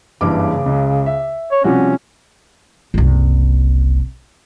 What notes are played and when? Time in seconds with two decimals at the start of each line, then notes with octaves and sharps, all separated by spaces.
0.21 F#1 G2 C#3 E3 D6
0.66 C#2
1.06 E5
1.51 C#5
1.64 C3 F3 G3 C#4 F#4
2.94 F#1 C2